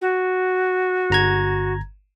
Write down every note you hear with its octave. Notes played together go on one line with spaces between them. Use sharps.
F#4
G1 A#5 G#6